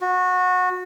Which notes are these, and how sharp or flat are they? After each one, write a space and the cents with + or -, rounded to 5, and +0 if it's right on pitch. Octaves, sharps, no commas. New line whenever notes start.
F#4 -20